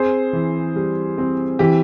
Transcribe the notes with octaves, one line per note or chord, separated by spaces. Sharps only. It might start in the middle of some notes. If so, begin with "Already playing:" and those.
Already playing: C4 G#4 C5
E3
G3
C4
E3 G4